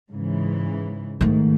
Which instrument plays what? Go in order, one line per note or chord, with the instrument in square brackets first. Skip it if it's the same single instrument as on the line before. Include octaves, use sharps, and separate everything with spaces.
[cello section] G#2 C#3 E3
[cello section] G#2 [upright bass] D#3 A3